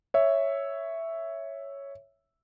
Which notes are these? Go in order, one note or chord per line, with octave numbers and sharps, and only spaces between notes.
C#5 E5